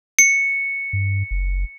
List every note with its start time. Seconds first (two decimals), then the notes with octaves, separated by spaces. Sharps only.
0.19 C#7
0.93 G2
1.31 F#1